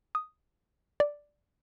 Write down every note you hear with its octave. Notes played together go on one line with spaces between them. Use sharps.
D#6
D5